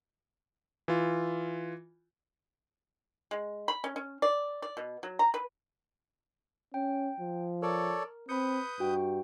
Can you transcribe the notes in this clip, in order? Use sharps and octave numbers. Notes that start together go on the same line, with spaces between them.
E3 F4
G#3
B5
C#4
C#4
D5
D5
B2
F#3
A#5
B4
C#4 G5
F3
A4 A#4 C#5 D5
C4 B4 B5 D#6 G6 C#7
G2 F#4 G5